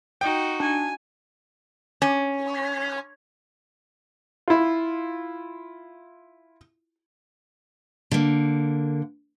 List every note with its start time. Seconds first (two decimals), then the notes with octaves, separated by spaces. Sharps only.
0.21 D#4 F#4 G5
0.60 D4 G#5
2.02 C#4
4.48 E4 F4
8.11 D3 A#3